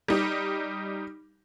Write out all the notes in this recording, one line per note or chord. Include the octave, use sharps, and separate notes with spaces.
G3 D#4 G4